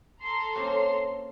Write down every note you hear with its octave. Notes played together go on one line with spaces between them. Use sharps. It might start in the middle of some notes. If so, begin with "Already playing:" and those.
A4 A#5 C6
A#3 C4 C#4